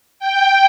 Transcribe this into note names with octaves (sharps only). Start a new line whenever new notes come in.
G5